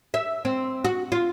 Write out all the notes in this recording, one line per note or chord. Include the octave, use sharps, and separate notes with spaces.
E5
C4
F#4
F4